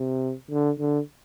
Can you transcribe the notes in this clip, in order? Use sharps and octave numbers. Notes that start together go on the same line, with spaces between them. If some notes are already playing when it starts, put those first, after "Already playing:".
Already playing: C3
D3
D3